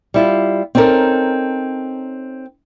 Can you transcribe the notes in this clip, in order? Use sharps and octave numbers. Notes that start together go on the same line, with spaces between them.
G3 E4 F4
C4 C#4 D#4 A4 A#4